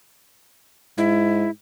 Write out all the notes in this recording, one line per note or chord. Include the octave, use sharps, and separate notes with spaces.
G#2 E4